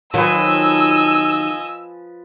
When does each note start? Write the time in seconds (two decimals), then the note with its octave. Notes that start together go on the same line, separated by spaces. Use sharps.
0.14 D#3 F3 F#3 B4 D#5 G#5 E6